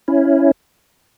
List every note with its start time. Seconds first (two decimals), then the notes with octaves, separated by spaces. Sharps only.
0.08 C#4 E4